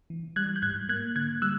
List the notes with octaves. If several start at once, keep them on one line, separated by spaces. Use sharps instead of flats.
E3
G3 F#6 G#6
G6
G#2 F#6 G#6
A#3 F#6 G#6
D3 F#6 G#6
G3 E6 F#6